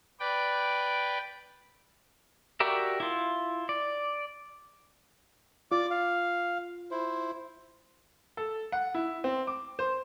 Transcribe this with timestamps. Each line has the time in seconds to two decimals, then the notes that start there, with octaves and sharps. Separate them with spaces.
0.20 B4 D5 G5
2.60 F#4 G4 A#4 D5 E5
3.00 E4 F4
3.69 D5
5.72 F4 D5 D6
5.91 F5
6.91 E4 C5
8.37 A4
8.72 F#5
8.94 E4
9.24 C4
9.47 D6
9.79 C5